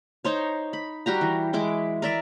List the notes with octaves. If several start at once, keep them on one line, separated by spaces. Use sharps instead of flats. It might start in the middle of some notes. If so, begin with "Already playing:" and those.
D#4 C5 C#5
B5
G3 F#4 G4 A#5
E3
E3 G#3 E4 D6
A#4 D5 E5